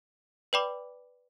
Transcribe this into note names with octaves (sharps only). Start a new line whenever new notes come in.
B4 D5 G5 B5 D6